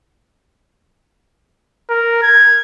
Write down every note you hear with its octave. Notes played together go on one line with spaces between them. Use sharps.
A#4
G#6